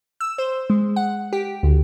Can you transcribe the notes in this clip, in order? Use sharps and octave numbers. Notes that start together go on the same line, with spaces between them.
E6
C5
G#3
F#5
G4
D2